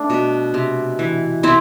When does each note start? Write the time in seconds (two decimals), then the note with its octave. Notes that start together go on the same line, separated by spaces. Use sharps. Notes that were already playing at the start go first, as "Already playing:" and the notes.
Already playing: A3 D4
0.10 B2
0.54 C3
0.99 E3
1.43 C3 C4 E4